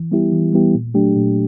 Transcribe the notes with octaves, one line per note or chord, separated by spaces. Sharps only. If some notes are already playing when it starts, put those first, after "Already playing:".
Already playing: E3
G3 B3 E4 G4
E3
G3 B3 E4 G4
A#2
F#3 A3 D4 G4
A#2